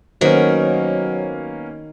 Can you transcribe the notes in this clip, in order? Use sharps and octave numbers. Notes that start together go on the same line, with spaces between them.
D#3 F#3 A#3 B3 C#4 C5